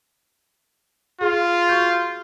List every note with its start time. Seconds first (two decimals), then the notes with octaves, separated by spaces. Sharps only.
1.21 F4 G#4
1.69 F#4 C#6 G6